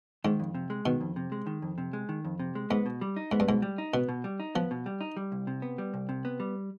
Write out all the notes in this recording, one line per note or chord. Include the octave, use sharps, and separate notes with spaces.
G#2 D#3
F2
C3
G#3
B2 D#3
F2
C3
G#3
D#3
F2
C3
G#3
D#3
F2
C3
G#3
G#2 B3
B2
G3
D#4
G#2 B3
G2
G#2 B2
G3
D#4
B2 B3
B2
G3
D#4
F3 B3
B2
G3
D#4
G3
C2
C3
B3
G3
C2
C3
B3
G3